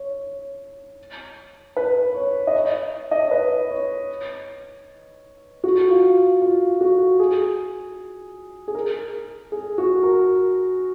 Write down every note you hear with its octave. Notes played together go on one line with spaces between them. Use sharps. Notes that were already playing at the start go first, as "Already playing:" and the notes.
Already playing: C#5
B4
C#5
D#5
C#5
D#5
C#5
B4
C#5
F#4
F4
F4
F#4
G#4
G#4
A#4
G#4
F#4
A#4